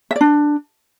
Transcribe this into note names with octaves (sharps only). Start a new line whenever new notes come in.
E5
D5
D4